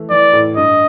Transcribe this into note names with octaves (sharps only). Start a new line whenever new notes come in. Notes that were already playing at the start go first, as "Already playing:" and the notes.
Already playing: E3 A3
E3 D5
A2
G2 D#5